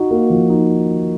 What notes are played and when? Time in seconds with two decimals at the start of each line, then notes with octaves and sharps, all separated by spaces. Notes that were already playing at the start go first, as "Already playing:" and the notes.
Already playing: D#4 F#4
0.11 A#3
0.30 F3
0.49 D#4